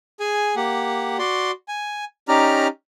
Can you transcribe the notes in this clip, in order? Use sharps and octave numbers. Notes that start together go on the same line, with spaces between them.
G#4 G#5
A#3 G4 F#5
F#4 D5 C6
G#5
C#4 D#4 G4 D5 A#5 F6